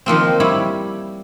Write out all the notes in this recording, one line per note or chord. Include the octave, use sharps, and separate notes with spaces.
D#3 F3 A#3 C4
G3 E4 C#5